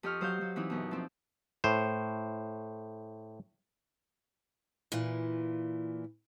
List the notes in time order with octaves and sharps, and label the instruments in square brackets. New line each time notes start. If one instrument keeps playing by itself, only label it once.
[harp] F2 G4 D#5 C#6 F6
F#3 C5 F5 G6
F#3
E3 C4 D#4 E4
F#2 B2
F3 C4
[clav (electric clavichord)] A2 C5
[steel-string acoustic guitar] A#2 E3